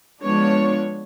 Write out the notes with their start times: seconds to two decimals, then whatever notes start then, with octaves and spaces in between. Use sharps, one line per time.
0.22 F3 G#3 B3 D4 C#5